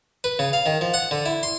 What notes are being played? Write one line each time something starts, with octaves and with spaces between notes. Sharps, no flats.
B4
C#3
F5
D#3
F3
F#5
D3
E4
C6